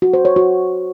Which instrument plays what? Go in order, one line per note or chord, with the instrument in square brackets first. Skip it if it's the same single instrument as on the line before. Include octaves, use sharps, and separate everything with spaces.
[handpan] F#4
C5
C#5
F#4